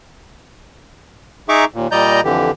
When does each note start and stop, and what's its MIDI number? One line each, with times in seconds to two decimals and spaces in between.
1.49 1.65 63
1.49 1.65 68
1.49 1.65 76
1.49 1.65 82
1.49 1.65 85
1.49 1.65 86
1.74 1.87 39
1.74 1.87 46
1.91 2.21 46
1.91 2.21 55
1.91 2.21 74
1.91 2.21 75
1.91 2.21 82
1.91 2.21 91
2.24 2.51 41
2.24 2.51 50
2.24 2.51 52
2.24 2.51 67